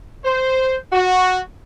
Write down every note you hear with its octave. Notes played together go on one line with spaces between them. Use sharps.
C5
F#4